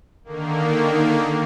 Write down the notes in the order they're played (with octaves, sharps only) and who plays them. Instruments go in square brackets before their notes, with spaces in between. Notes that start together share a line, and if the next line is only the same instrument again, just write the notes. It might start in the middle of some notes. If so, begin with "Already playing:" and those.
[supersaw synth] D3 D#3 A#3